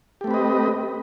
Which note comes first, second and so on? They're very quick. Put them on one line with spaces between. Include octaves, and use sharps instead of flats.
G4 A3 C4 B4 D#5